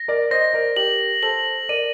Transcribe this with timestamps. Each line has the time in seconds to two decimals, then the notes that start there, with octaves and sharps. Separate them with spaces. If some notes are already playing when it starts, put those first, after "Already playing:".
Already playing: A#6
0.08 A#4 D5
0.31 C5 D#5 A#6
0.54 A#4 D5
0.76 G4 A#4 F#7
1.23 A4 C5 F#7
1.69 A#4 D5 D#7